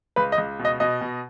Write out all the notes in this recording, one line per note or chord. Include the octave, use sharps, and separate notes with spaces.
C#2 B4
D#5
C#2
B2
D#5
B2 D#5
B2